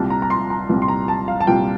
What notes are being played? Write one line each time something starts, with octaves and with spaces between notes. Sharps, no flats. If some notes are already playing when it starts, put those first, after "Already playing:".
Already playing: C2 A#2 G3 A5
A#5
A#5
C6
A#5
C2 A#2 G3
C6
A#5
A5
F5
A5
C2 A#2 G3 G5